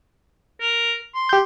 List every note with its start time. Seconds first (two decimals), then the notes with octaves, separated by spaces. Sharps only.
0.61 A#4
1.15 C6
1.29 G4 G6